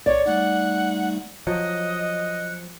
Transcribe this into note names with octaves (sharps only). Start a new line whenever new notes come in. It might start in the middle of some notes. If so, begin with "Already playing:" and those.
B1 C#5 D5
G3 A3 D#4 F#5
F3 F#3 D#5 F#6 C#7